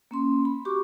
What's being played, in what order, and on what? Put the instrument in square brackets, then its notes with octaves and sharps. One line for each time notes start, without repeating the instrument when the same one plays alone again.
[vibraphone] A#3 C#4 C6
B5
F#4 G4 C#6 D6